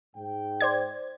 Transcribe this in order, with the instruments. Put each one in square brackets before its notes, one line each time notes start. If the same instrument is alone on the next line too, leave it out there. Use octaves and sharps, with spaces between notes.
[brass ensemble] G#2 G5
[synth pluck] C5 D5 G#6